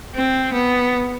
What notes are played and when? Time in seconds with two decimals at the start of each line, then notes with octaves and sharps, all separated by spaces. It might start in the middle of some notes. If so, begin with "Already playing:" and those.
0.15 C4
0.53 B3